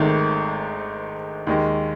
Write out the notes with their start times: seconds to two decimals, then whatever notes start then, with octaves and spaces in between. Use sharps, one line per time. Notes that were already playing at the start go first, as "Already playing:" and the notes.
Already playing: G#1 G#2 D#3 A3
1.47 D#2 D#3 G#3